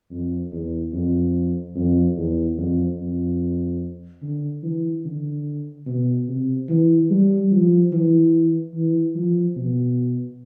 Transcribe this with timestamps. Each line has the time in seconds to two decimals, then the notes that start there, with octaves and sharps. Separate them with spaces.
0.11 F2
0.52 E2
0.93 F2
1.75 F2
2.17 E2
2.58 F2
2.98 F2
4.22 D3
4.63 E3
5.05 D3
5.87 B2
6.28 C3
6.69 E3
7.10 G3
7.52 F3
7.92 E3
8.75 E3
9.15 F3
9.56 B2